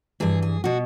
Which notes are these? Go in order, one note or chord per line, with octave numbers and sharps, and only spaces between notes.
G2 E3 G#4
G#4
B2 F#4